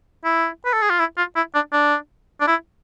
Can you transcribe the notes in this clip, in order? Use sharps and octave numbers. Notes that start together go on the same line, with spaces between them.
E4
B4
A4
G#4
F4
E4
F4
E4
D4
D4
D4
E4